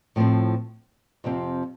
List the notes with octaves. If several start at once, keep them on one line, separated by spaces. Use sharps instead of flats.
A2 F3 C4
F2 C3 F3 C4